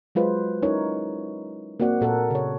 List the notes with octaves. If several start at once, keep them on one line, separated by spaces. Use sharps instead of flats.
F#3 G#3 F4 B4 C5
C#4 D#4 E4 A#4 C#5
A#3 C4 F#4 D5 F#5
A#2 A4 A#4 F#5
C#3 C#5